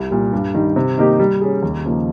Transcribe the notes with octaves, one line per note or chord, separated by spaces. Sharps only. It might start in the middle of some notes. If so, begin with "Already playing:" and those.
Already playing: C2
A#2 G3
G2
D#3 G3
C3
D#3 A#3 D#4 G4
G3
C#4 G#4
D#2
C#3 F3 A#3 D#4